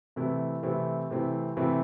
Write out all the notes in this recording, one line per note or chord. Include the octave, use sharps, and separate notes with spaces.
C3 E3 A3 C4 E4
C3 E3 A3 C4 E4
C3 E3 A3 C4 E4
C3 E3 A3 C4 E4